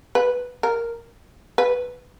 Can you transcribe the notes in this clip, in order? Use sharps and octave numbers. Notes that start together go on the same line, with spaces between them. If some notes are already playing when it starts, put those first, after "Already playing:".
B4
A#4
B4